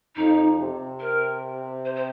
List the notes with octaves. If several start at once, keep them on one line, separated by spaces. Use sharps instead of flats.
F2 D#4
C3
A#4
C5
C5